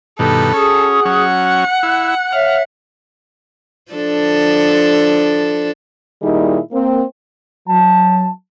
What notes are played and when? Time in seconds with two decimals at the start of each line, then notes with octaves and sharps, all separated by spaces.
0.19 G2 B2 D#3 A4
0.54 C#4 F#4 G#4 D#6
1.05 F#3 C#4 F#5
1.44 F#6
1.83 E4
2.32 C#5 E5 F5
3.92 F3 D4 A4
6.22 A#2 D#3 G3 D#4 E4 G#4
6.73 A#3 C4
7.68 F#3 A5